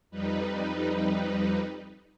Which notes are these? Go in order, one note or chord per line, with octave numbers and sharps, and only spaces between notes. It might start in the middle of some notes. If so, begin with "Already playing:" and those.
F2 G3 D#4 B4